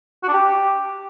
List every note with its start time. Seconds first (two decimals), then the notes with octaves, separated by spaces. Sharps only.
0.23 F#4
0.28 D4
0.34 G4